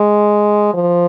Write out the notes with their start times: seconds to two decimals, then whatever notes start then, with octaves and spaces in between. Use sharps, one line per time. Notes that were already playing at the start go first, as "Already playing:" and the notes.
Already playing: G#3
0.74 F3